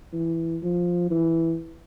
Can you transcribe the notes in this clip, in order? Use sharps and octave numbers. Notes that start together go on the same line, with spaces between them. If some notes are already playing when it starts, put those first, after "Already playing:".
E3
F3
E3